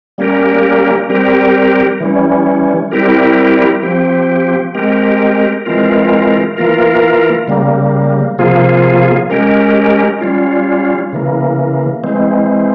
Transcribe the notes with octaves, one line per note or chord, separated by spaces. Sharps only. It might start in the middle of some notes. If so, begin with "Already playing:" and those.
G3 A#3 C#4 G4 A#4
G3 C4 G4 A#4
E3 G3 C#4
G3 C4 E4 G4 A#4
F3 C4 G4
G#3 C4 G4 A#4
E3 G#3 C4 F4 A#4
E3 A#3 F4 A#4
C#3 G3 A#3
C3 F3 A#3 F4 G#4
G#3 C#4 G4 A#4
G3 C#4 F4
C#3 E3 A#3
E3 G#3 C4